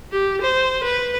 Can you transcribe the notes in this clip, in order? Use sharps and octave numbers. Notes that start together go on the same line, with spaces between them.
G4
C5
B4